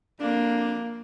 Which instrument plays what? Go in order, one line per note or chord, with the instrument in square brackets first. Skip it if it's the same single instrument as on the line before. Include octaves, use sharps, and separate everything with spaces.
[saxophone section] F2 D4 [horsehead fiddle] A#3